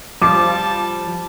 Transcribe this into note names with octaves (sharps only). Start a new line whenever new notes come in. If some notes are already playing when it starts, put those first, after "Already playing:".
F3 G3 A5 D6